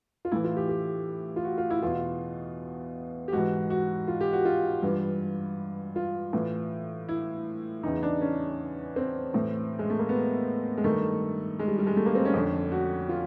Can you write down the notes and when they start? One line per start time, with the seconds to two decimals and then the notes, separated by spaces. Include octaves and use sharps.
0.25 F4
0.31 A2 E3 E4
0.44 F4
0.57 G4
0.69 G4
1.36 F4
1.44 F#4
1.58 F4
1.70 E4
1.82 E2 B2 F4
3.28 G4
3.33 G#2 E3 F#4
3.70 F#4
4.08 F4
4.21 G4
4.33 F#4
4.45 F4
4.82 G2 E3
5.96 F4
6.33 A2 E3
7.09 E4
7.83 E2 C#3 E3 D#4
8.03 D4
8.21 C#4
8.96 C4
9.33 A2 E3
9.79 G#3
9.90 A3
9.99 A#3
10.09 B3
10.77 G#3
10.84 G2 D#3 A3
11.59 G#3
11.68 G3
11.78 G3
11.87 G#3
11.96 A3
12.06 A#3
12.15 C4
12.25 C#4
12.34 F2 D3
12.72 F#4
13.09 F4